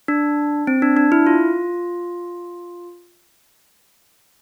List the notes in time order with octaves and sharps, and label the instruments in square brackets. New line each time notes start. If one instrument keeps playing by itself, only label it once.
[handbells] D4
C4
D4
D4
E4
F4